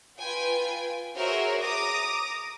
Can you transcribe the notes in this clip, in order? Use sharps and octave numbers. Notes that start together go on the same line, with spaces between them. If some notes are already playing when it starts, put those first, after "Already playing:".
F4 B4 G5 G#5
F#4 G#4 A#4 C5 C#5 E5
A#5 D6 D#6 A#6